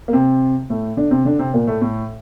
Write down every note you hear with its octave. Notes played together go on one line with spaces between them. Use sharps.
A#3
C3 C4
A2 A3
D3 D4
C3 C4
D3 D4
C3 C4
A#2 A#3
A2 A3
A2 A3